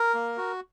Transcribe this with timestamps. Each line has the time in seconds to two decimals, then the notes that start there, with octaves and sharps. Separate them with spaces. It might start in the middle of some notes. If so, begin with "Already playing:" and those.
Already playing: A#4
0.14 A#3
0.37 F#4